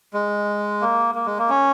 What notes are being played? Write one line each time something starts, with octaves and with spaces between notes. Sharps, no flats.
G#3
A#3
A#3
G#3
A#3
C#4